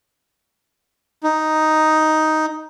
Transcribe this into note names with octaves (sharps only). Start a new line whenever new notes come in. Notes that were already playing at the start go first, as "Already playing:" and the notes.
D#4